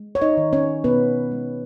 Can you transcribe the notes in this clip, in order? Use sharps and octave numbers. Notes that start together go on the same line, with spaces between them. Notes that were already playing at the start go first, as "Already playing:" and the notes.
Already playing: G#3
C#5
D#4 D#5
D#3
C#4 C#5
B2 B3 B4
G#3